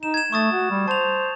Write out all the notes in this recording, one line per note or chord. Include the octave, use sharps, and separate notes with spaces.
D#4 E7
G#6 E7
A3 C#6 D#6 A6
F#4
G3
C5 A5 F7